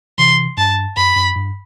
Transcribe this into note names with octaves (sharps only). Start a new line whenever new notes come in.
C3 E3 C6
G2 A5
F#2 B5
F#2
G2